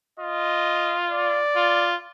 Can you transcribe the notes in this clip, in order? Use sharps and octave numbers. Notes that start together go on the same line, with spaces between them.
F4 D#5
D5
F4